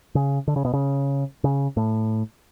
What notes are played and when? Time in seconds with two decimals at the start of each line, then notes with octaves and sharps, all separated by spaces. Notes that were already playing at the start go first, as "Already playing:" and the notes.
0.15 C#3
0.48 D3
0.56 C#3
0.65 B2
0.73 C#3
1.44 C#3
1.77 A2